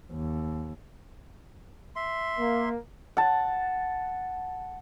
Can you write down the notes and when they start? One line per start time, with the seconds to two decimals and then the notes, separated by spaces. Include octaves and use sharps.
0.12 D#2
1.96 E5 C6
2.39 A#3
3.17 F#5 A5